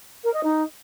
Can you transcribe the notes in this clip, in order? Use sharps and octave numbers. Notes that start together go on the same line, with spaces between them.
A#4
D#5
D#4